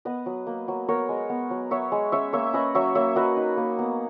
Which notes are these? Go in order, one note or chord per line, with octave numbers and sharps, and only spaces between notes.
B3 B4 D#5
F#3
A#3
F#3
B3 A#4 C#5
G#3
B3
F#3
B3 C#5 E5
G#3
C#4 C#5 E5
A#3 C#5 E5
C#4 B4 D#5
F#3 C#5 E5
A#3 C#5 E5
F#3 B4 D#5
D#4
A#3
B3